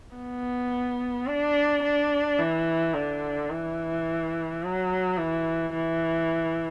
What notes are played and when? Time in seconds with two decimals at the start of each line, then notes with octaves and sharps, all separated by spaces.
0.16 B3
1.27 D4
1.83 D4
2.39 E3
2.94 D3
3.50 E3
4.63 F#3
5.17 E3
5.73 E3